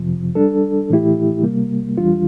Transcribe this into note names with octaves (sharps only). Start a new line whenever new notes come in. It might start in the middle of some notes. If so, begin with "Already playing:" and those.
Already playing: F2 C3 F3
G3 D4 A4
A2 E3 A3 E4 G4
C3 G3 A#3
E2 E3 G3 D4 F4